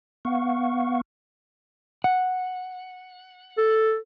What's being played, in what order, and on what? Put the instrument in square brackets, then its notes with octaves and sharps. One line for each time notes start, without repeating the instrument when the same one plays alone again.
[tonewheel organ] B3 F5 F#5 C#6
[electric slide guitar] F#5
[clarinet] A4